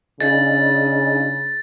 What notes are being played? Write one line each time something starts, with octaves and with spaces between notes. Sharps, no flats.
C#3 D4 D#4 G#4 A6